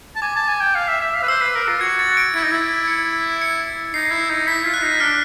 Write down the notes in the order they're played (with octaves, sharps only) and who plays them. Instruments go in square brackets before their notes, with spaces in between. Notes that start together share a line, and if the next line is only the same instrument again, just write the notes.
[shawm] A5
[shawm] G#5 [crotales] D6
[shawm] A5
G#5
G5
F5
E5
E5
F5
B4
[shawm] C5 [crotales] E6
[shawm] B4
A#4
F4
[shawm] F#4 [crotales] G#6
[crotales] A6
D7
[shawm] E4 [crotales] D7
[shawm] D#4
E4
[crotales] C#7
C#7
[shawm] D#4 [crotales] C7
[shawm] E4
D#4
[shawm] E4 [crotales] B6
[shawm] F4
[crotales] F#6
[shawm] D#4
[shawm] D4 [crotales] F6